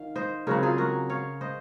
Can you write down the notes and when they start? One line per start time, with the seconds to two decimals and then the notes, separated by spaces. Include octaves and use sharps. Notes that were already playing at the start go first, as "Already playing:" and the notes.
Already playing: D#3 F5
0.16 C5 D#5
0.47 C#3 F#3 C4 F#4 A#4
0.63 F4 G#4
0.78 F#4 A#4
1.09 C#5 F5
1.41 C5 D#5